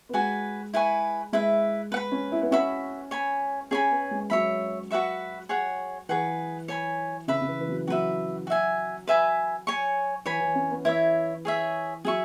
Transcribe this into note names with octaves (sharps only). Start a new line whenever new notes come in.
B3
G#3 F#4 B4 G#5
E4 B4 G#5 C#6
G#3 E4 B4 E5
B3 B4 F#5 B5
C#4
E4
B3
C#4 F#4 E5 B5
C#5 G#5 B5
C#4 G#4 C#5 G#5 B5
B3
G#3
F#3 C#5 E5 B5
F#4 B4 E5 C#6
G#4 C#5 F#5
E3 G#4 B4 F#5 C#6
C#5 G#5 B5
C#3 B4 E5 B5
C#3
E3
E3
F#3
F#3 F#4 B4 E5
F#4 E5 G#5
B4 E5 G#5 B5
C#5 G#5 C#6
E3 C#5 G#5 B5
E3
C#4
B3
E3 E4 C#5 E5
G#4 C#5 E5
F#3 G#4 E5 C#6